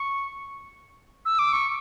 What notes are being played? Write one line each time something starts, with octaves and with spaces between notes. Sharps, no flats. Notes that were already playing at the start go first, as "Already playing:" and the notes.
Already playing: C#6
E6
D6
C#6